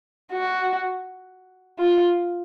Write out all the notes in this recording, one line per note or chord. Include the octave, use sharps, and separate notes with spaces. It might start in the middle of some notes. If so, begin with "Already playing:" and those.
F#4
F4